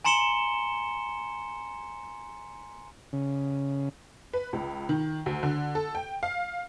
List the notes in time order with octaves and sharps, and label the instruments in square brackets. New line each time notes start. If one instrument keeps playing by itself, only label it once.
[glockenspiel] G#5 A#5 C6 C#7 E7 G7
[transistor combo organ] C#3
[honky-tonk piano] B4
C#2
D#3
D2
D3
A4
G5
F5